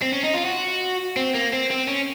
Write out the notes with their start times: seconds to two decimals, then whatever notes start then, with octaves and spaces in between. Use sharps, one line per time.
0.02 C4
0.13 C#4
0.24 D#4
0.34 F4
0.45 F#4
1.17 C4
1.34 A#3
1.53 C4
1.71 C4
1.88 C#4